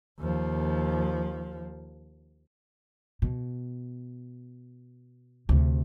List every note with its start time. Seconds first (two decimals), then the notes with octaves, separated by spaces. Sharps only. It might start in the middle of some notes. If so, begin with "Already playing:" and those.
0.20 D#2 F3
3.22 B2
5.49 D2 C3